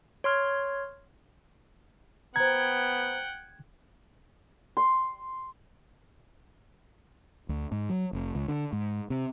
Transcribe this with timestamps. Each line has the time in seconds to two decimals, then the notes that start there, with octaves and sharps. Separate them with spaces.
0.24 C#5 C6 F6
2.36 B3 C5 F#5 G5 A#5 G#6
4.77 C6
7.49 D2
7.72 G#2
7.90 F#3
8.13 F1
8.35 C#2
8.48 D3
8.73 G#2
9.10 C3